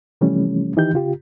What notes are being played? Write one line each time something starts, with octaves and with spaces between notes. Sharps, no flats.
C3 E3 F3 G3 A3 C#4
D#3 E3 D#4 G4 G6
C#3 F4 G4